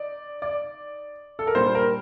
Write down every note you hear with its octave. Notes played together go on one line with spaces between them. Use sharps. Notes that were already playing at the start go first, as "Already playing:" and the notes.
Already playing: D#4 D5
D5
A4
A#4
A#2 G3 D4 C5
A#4